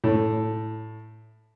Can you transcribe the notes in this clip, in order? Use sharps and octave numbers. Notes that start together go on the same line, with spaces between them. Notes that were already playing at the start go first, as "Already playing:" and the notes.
A2